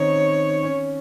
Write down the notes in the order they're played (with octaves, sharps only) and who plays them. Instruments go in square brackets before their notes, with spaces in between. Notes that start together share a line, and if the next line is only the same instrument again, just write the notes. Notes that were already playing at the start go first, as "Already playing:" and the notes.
Already playing: [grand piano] D#3 C4 C#4 D#4 [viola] C#5
[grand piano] C#4